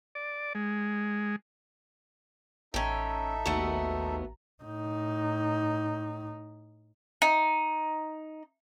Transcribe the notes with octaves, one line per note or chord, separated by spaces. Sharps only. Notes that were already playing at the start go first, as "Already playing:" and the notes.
D5
G#3
A1 C#4 D#4 A4 E5 G5 A#5
D#2 A3 B3 F#4
A2 D#4
D#4